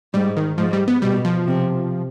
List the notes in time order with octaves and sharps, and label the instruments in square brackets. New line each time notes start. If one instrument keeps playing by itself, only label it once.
[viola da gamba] G#2 [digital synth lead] G3
[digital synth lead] D#3
[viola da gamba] G#2 [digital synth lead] F3
[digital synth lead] G3
B3
[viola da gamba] B2 [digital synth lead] G3
[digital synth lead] F3
[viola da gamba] C3